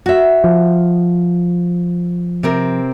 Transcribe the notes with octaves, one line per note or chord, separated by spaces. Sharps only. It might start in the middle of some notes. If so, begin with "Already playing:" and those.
F#4 E5
F3
C3 C4 A#4